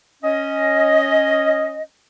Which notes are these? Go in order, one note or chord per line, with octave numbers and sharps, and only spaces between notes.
C#4 D#5